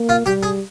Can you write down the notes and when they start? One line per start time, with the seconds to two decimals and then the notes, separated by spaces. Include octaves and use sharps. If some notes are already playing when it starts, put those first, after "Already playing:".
Already playing: A#3
0.09 F4
0.26 G3 G4
0.43 G#4